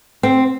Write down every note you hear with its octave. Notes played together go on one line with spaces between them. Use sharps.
C4